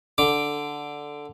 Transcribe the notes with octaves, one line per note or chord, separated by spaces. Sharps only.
D3 D6